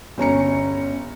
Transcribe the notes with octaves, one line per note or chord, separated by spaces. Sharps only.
G1 C#4 A#5 C#7